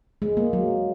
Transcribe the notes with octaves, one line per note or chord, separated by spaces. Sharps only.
G#3
A#3
F#3